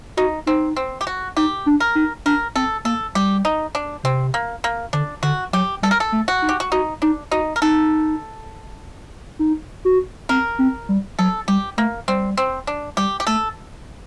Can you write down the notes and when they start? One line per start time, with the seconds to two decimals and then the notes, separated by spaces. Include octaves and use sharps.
0.17 D#4 F#4
0.46 C4 D#4
0.76 C4
1.01 G4
1.07 F#4
1.36 D#4 G4
1.66 D4
1.80 A#4
1.95 D#4
2.26 D4 A#4
2.55 C4 A4
2.85 A#3 A4
3.15 G3 G4
3.45 D#4
3.75 D4
4.04 C3 C4
4.34 A#3
4.64 A#3
4.93 D3 D4
5.23 D3 F#4
5.53 F#3 G4
5.83 G3 A4
5.91 A#4
6.00 A4
6.12 A3
6.28 F#4
6.42 D#4
6.49 G4
6.60 F#4
6.72 D#4 F#4
7.02 D4 D#4
7.31 D#4 F#4
7.56 A#4
7.62 D#4 A4
9.39 D#4
9.85 F#4
10.29 C4 A#4
10.59 C4
10.89 G3
11.19 F#3 A4
11.48 G3 G4
11.77 A3 A#3
12.08 G3 C4
12.37 C4
12.67 D4
12.97 G3 G4
13.20 G4
13.27 A3 A4